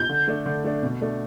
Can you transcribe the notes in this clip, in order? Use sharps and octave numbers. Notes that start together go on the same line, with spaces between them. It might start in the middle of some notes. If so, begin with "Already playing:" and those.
Already playing: G6
D3
A3 D4
D3
A3 D4
B2
A3 D4